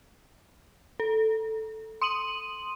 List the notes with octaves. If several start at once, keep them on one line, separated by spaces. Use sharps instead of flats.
A4
C6 D#6 D#7 F#7